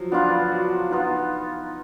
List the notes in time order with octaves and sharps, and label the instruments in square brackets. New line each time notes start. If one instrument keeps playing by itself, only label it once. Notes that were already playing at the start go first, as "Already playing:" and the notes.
Already playing: [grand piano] F3 F#3
[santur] B3 F4 B4 [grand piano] D4
[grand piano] F#4
[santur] B3 F4 B4 [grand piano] D#4